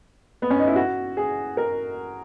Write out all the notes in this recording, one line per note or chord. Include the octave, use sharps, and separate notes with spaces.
B3
C#4
D#4
E4
F#4
G#4
A#4